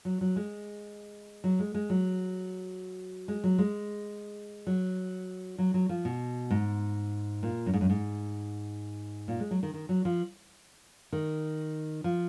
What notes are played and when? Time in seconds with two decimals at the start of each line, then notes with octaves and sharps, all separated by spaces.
0.05 F#3
0.21 F#3
0.36 G#3
1.44 F#3
1.59 G#3
1.75 G#3
1.90 F#3
3.28 G#3
3.44 F#3
3.58 G#3
4.67 F#3
5.58 F#3
5.74 F#3
5.89 F3
6.05 B2
6.50 G#2
7.43 A#2
7.66 F#2
7.73 G#2
7.81 F#2
7.90 G#2
9.28 A#2
9.40 G#3
9.51 F#3
9.63 D#3
9.74 D#3
9.89 F#3
10.05 F3
11.13 D#3
12.04 F3